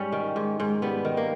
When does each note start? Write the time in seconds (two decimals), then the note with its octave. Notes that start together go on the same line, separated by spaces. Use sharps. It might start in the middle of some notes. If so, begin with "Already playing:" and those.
Already playing: G#2 G3 C#4
0.12 D#3
0.36 G#2
0.60 G#2
0.82 G3 B3
1.05 D#3
1.17 A#3